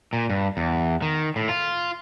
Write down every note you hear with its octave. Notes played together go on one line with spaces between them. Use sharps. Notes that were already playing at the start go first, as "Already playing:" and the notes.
A#2
G2
E2
D#3
A2
F4